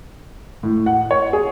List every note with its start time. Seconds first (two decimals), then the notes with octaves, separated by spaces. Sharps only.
0.63 A2
0.86 F#5
1.11 C#5
1.33 G#4